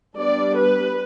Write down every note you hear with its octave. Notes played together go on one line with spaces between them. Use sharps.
G3 B3 D4 D5
B4